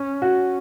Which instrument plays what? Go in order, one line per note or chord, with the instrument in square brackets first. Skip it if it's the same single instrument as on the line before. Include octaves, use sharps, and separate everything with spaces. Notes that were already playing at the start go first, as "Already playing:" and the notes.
Already playing: [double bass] C#4
[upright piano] F#4